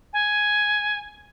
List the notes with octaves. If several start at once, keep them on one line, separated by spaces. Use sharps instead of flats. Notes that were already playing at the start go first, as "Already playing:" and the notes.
G#5